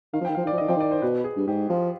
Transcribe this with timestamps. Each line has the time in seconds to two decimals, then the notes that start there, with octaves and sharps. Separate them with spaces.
0.13 D#3 F5
0.21 F3
0.25 D#3 G5
0.35 F3 F5
0.45 D#3 D5
0.53 F3
0.58 D#3 D#5
0.68 F3 G5
0.76 D#3 D5
0.91 C5
1.02 B2 B4
1.24 G#4
1.36 G2
1.47 G#2 G4
1.69 F3 F4